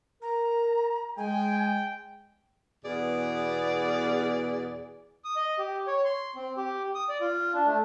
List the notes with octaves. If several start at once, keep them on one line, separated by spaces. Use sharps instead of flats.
A#4 A#5
G#3 G5 G#5
E2 B2 G#4 D5
D#6
D#5
G4
C#5
C6
C4
G4
D#6
D5
F4
D4
A3